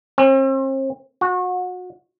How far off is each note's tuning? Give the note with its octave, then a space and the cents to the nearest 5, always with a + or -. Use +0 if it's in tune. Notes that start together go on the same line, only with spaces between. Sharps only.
C4 +40
F#4 -30